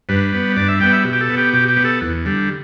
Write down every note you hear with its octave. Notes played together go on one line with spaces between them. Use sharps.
G2 B4
G3 B3
G2 D5
E5
G3 B3 G5
E5
B2
G4
A4
B3
G4
B2 G4
G4
B3
A4
E2
D3 G3